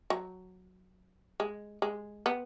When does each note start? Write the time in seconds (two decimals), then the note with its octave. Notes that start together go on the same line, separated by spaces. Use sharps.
0.10 F#3
1.40 G#3
1.82 G#3
2.26 B3